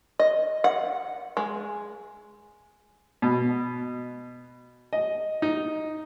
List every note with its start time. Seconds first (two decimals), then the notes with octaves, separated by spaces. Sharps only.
0.19 D#5
0.64 F#5
1.37 G#3
3.22 B2
4.93 D#5
5.42 D#4